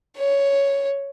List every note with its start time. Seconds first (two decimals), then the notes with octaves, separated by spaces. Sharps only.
0.17 C#5